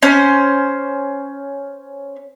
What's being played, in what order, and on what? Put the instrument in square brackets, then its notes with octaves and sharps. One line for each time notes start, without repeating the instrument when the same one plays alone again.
[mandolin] C#4 C5